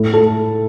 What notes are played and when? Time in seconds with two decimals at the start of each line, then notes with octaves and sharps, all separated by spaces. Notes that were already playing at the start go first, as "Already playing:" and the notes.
Already playing: A2
0.14 A4